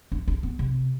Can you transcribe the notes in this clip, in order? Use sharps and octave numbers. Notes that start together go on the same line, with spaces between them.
D4
D4
B3
C3